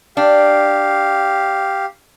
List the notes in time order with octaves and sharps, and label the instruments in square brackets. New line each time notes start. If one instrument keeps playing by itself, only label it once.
[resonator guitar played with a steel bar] D4 [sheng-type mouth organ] G4 F5